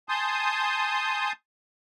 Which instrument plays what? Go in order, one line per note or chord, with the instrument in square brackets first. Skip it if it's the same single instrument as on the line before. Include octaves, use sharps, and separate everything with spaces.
[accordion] G#5 A5 C6 D#6 G6